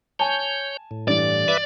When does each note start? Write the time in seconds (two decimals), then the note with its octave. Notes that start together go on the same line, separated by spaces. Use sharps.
0.19 C#5 G#5 A5 G6
0.91 A2
1.08 G2 E3 D5
1.48 B4 E5 D6